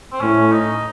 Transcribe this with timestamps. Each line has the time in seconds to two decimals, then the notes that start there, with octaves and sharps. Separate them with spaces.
0.12 C4
0.21 A2 C#4
0.52 D#4